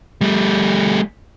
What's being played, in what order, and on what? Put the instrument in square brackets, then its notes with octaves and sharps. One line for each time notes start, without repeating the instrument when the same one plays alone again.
[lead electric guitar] G3 A3